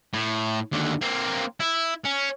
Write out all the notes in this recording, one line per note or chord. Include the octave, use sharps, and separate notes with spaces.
A2
D#2 D3
A#3 C4
E4
C#4